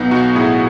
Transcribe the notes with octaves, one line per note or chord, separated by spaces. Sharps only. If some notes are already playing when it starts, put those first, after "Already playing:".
Already playing: B1 B3 D#4
B1 D#4 F#4
A2 E4 G#4